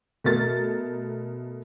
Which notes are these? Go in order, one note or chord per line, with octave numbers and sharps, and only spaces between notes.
B2 A3 A#4 A6